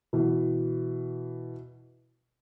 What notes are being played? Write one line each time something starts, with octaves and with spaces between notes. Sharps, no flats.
B2 E3